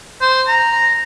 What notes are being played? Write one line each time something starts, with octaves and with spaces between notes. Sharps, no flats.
C5
A#5